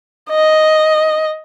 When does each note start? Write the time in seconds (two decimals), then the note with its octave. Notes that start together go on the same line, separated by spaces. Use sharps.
0.30 D#5